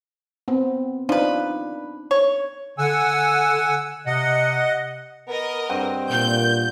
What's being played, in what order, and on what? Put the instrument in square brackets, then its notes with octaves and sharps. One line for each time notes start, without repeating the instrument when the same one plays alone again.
[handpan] B3 C4
[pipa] F3 B4 [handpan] D4 D#4
[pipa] C#5
[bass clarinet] D3 [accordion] F#5 G#5 E6
[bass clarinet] C3 [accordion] D#5 F#5
[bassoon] B3 [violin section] A#4 D#5
[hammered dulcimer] G2 F#5 [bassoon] C4
[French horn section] A#2 [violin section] G6